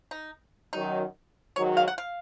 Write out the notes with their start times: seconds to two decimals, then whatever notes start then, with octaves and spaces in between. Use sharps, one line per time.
0.11 D#4
0.73 F#2 D#3 F#3 D#4
1.56 G#2 D#3 F#3 C#5
1.77 F5
1.88 F#5
1.98 F5